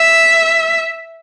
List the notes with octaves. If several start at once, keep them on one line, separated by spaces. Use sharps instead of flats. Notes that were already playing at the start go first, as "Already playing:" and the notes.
Already playing: E5